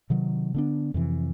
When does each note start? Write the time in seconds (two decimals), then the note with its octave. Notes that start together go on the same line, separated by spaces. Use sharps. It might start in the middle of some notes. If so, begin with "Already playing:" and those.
0.10 C3 D#3 F#3
0.54 D3 B3 D4
0.94 F2 C3 E3